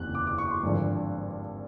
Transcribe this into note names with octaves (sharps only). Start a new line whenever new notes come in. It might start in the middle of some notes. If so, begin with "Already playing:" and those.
Already playing: F#1 E2 C3 F#6
D6
D6
C#6
C6
G#1 G2 D3 F3